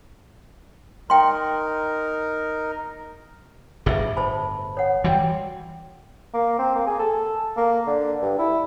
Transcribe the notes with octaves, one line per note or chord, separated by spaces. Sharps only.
D#4 A#4 G5 C6
G1 A2 G#4 E5
C5 A5 B5
C#5 F#5
E3 G3 F#4 G5
A#3
C4
A#3
G#4
A4
A#3
D3
G2
E4